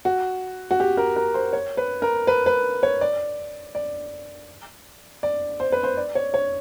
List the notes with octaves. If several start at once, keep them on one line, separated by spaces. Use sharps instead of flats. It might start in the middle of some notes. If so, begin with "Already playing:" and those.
F#4
F#4
G4
A#4
A#4
C5
C#5
B4
A#4
B4
B4
C#5
D5
D5
D5
C5
B4
C5
D5
C#5
C#5